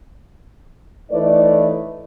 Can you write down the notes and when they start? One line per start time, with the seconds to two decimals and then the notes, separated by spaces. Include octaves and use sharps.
1.11 E3 A3 D#4 B4 C#5 D5